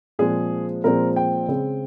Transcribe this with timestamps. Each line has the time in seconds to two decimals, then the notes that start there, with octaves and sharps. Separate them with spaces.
0.19 A#2 F3 G#3 C4 G#4
0.84 A#2 F3 G#3 C4 A#4
1.16 G5
1.48 C#3 G#3 C4